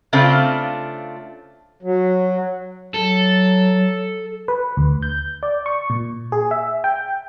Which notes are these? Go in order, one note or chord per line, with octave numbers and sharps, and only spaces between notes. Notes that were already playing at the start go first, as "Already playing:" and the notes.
C#3 A3 C4 D4 F4
F#3
F#3 A4
B4
D2
G6
D5
C#6
A#2
G#4
E5
G5